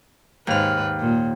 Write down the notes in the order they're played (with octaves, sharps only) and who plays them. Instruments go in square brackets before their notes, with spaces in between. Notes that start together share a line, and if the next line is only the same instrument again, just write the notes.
[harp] D#2 F6 [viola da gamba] G#2 B4
[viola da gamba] A#2